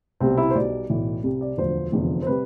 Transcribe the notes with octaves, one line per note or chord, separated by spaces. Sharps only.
C2 B2 G3 C4
E4
C5
B1 B2 G3 D5
B1 A2 E3
C2 C3 G3
D5
E1 D2 D3 F3 C5
F1 E2 D3 F3
C5
C3 G3 B4